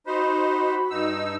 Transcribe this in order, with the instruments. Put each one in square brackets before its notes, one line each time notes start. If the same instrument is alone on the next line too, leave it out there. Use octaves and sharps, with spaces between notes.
[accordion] D#4 C5 [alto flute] F#4 [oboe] B5
[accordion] G2 D#4 E6